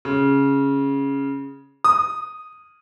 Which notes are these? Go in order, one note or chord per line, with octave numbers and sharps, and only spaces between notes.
C#3
D#6